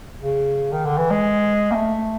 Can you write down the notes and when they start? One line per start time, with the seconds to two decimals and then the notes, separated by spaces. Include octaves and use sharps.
0.21 C#3
0.72 D#3
0.85 D3
0.98 E3
1.11 G#3
1.71 A#3
1.75 A3